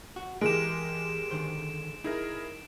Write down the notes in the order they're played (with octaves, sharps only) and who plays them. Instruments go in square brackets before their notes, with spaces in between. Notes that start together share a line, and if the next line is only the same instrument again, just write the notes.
[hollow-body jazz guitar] F#4
[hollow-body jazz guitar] E3 [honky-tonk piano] G#3 [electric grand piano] G4 A#4 [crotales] D7 E7
[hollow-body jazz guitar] D3 D#3 C5
[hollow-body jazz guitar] D#4 [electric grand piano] E4 G#4 A#4